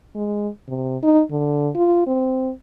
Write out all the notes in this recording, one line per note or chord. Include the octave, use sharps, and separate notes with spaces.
G#3
C3
D#4
D3
F4
C4